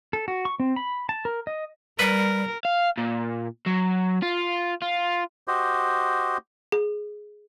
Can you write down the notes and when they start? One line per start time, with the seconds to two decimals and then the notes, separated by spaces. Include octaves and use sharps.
0.13 A4
0.28 F#4
0.45 C#6
0.60 C4
0.76 B5
1.09 A5
1.25 A#4
1.47 D#5
1.99 G3 A#4 B4
2.65 F5
2.98 A#2
3.66 F#3
4.22 F4
4.82 F4
5.48 F#4 G4 C5 D#5
6.72 G#4